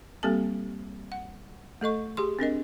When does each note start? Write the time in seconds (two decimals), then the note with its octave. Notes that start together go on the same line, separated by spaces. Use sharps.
0.23 G3 A#3 C4 G4 A4 A5
1.12 F#5
1.81 A3 A4 D#5 C#6
2.17 G4 G#4 C6
2.39 C4 D4 A#4 D#5